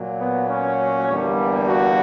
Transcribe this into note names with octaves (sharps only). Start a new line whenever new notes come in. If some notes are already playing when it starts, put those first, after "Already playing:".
Already playing: A#2 F#3
B3
C#4
E2 D3 G3 A#3
F#4